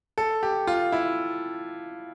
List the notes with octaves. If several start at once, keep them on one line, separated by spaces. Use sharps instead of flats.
A4
G4
F4
E4